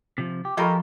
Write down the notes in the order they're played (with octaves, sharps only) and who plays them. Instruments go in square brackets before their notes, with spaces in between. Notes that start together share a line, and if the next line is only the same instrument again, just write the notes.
[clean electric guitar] C3 F3
G4
[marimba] F3 B5 C#6 [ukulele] F4 A4 D#5 [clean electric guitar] G4 A#4